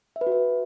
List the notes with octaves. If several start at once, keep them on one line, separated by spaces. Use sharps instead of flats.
E5
B4
F#4
E5